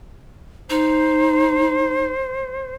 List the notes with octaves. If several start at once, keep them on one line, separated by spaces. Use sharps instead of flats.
D#4 C5